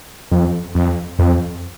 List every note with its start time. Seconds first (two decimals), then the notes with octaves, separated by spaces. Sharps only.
0.31 F2
0.75 F2
1.19 F2